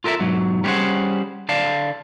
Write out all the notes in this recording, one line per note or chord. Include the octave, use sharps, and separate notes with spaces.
F4 A4 A#4 D#5 E5
B1 G#2 F#3
G3 B3 C#4 G#4 C5 F#5
D3 D5 F5 A5